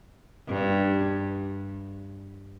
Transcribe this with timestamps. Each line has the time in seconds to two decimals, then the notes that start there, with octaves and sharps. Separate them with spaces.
0.48 G2